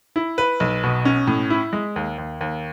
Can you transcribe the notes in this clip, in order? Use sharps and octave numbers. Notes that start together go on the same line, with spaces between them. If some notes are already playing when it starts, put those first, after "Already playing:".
E4
B4
B1
B2
C#4
A2
E4
G#3
D#2
D#2
D#2